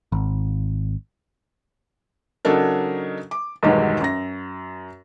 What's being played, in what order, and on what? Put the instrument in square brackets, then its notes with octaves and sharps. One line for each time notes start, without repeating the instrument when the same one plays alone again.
[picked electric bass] G#1
[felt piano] C#3 F#3 D4 D#4 A4 A#4
D6
B1 E2 G2 D#3 F#3 G#3
F#2 A#6